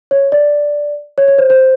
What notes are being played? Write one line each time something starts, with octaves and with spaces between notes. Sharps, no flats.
C#5
D5
C#5
C#5
C5
C5